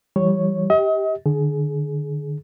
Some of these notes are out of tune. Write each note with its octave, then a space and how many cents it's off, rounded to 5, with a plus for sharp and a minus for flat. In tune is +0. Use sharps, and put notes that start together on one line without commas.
E3 +30 G3 -10 C#5 +0
G4 +0 D#5 +40
D3 +25 G#4 +20